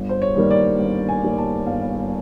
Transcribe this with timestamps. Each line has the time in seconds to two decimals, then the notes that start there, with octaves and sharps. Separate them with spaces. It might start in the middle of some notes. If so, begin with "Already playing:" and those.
Already playing: G1
0.09 C5
0.22 C#5
0.36 G2 D#3 G3 A#3
0.51 D5
0.79 G1
1.09 G#5
1.23 G2 D#3 G3 A#3
1.38 A5
1.67 G1 F5